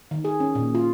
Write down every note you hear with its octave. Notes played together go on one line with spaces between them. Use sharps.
D#3
G#4
C#4
A#2
F4